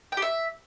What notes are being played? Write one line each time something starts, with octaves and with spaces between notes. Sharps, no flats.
G5
G4
E5